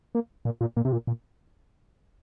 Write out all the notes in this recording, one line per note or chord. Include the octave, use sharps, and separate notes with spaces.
A#3
A#2
A#2
A#2
C3
A#2
A#2